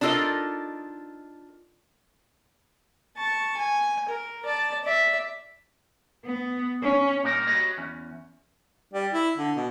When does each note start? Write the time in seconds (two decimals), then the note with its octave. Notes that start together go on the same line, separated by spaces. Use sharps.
0.01 D4 D#4 F4 A4 A#4 D#5
3.17 A5 C#6
3.57 G#5
4.09 A#4
4.45 D5 A5
4.85 D5 E5
6.24 B3
6.83 C#4
7.24 A#2 G3 A#3 D#4 A#4
7.47 F#4 G4 A#4 B4 C#5 D#5
7.78 E2 C#4
8.93 G3
9.13 E4
9.38 D3
9.56 B2